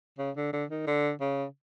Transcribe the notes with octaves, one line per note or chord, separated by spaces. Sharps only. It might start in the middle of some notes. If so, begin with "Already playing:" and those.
C#3
D3
D3
D#3
D3
C#3